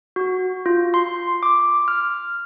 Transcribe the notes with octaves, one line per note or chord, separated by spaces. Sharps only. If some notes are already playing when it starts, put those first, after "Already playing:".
F#4
F4
C6
D6
F6